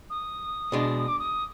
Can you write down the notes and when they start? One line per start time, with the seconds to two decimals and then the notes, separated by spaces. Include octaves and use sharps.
0.10 D#6
0.72 B2 G#3 D4
1.08 D6
1.19 D#6